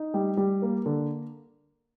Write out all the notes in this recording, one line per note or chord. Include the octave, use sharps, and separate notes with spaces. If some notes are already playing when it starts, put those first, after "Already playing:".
Already playing: D#4
G3
G3
A#3
D3